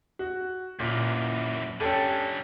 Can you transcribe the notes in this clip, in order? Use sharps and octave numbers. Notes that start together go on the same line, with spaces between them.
F#4
F#2 A#2 E3
D3 G3 C#4 G4 A4